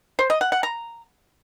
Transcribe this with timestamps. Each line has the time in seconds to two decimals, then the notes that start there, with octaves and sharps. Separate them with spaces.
0.19 C5
0.30 D#5
0.41 F#5
0.52 F#5
0.63 A#5